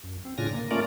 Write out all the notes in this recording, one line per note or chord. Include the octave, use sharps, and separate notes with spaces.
F#2
C4
A2 C#3 D4 F4 G#5 A#6
A#3
A3 A#3 C#4 F4 A#4 D5